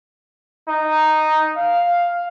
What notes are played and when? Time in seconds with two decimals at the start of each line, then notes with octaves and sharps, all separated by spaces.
0.68 D#4
1.57 F5